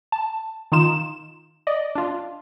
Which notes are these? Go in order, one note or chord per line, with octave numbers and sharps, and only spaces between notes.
A5
D#3 D#4 F4 E7
D5 D#5
D4 F4